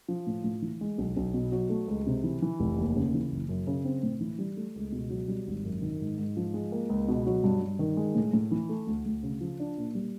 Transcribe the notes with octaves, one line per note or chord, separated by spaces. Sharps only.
F3
A2
A2
E3
G#3
B1
B1
B2
F#3
A3
C#2
C3
E3
E3
F1
D#2
C#3
E3
F#1
F#2
C#3
C4
A2
E3
G3
A3
C#2
B2
F#3
G3
G#1
F#2
D#3
G#2
G#2
F3
G#3
A#3
C#2
B2
F#3
G2
G2
D#3
G#3
A2
A2
E3
A3
D2
D2
C#3
F3
D4
A#2
G3